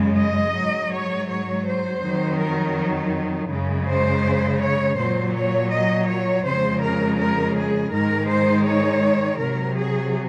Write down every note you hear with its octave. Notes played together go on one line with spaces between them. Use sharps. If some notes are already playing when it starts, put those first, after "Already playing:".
Already playing: F#2 C#3 G#3
D#5
G#2 F#3
C#5
C#5
C5
F2 D#3 F#3
A#4
F#2 C#3 G#3
C5
C#5
A#2 F#3 C5
C#5
D#5
C#5
F2 C#3 G#3 C5
A#4
A#4
G#4
G#2 D#3 G#3 A#4
C5
C#5
C3 F#3 A#4
G#4